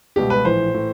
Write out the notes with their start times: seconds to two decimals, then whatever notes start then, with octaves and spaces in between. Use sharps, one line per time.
0.16 C#2 B2 G3 G4
0.30 B4
0.45 A#1 A2 E3 C5
0.74 A2 E3